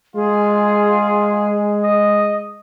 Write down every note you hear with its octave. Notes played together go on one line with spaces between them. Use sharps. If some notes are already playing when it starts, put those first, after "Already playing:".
G#3 F4 G#4
D#5